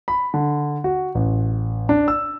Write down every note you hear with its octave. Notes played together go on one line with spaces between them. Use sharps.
B5
D3
F#4
A1
D4
E6